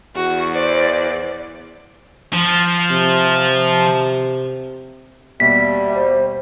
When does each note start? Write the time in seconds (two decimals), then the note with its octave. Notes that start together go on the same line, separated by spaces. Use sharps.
0.15 E2 F#4
0.54 C5 D5
2.33 F3
2.91 C3
5.40 D#2 B2 G3 E5 B6
5.95 C5